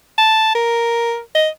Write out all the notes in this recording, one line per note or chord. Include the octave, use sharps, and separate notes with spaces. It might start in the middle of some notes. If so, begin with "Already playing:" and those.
A5
A#4
D#5